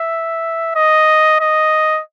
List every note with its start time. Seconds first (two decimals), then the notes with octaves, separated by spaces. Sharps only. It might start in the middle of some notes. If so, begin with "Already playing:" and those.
Already playing: E5
0.76 D#5
1.41 D#5